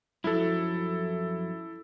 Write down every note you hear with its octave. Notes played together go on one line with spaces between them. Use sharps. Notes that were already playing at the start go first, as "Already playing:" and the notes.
F#2 F3 F#3 E4 A4